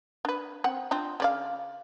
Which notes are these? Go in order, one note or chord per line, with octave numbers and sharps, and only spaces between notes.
D4 B4
C4 F#5
C4 D4 F4
C#3 D5 F5